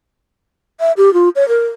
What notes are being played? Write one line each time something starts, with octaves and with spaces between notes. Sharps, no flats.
E5
G4
F4
C#5
A#4